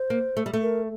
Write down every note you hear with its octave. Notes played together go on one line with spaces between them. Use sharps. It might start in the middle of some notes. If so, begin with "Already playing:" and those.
Already playing: C5
A#3
A3
G3
A3
A#4